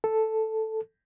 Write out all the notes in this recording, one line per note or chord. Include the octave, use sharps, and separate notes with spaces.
A4